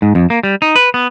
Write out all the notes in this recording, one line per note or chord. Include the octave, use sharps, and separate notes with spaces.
G#2
F2
A#3
G3
D#4
B4
B3